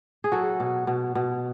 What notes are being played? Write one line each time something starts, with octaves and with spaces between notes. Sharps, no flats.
G#4
F#3 F#4 A4
B2
B2
B2